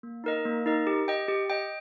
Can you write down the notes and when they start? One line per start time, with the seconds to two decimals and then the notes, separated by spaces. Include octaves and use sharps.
0.03 A#3
0.24 D#4 A#4 D#5
0.45 A#3
0.66 D#4 A#4 D#5
0.87 G4
1.08 D#5 G5
1.28 G4
1.50 D#5 G5